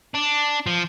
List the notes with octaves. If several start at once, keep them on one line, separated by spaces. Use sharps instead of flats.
D4
F3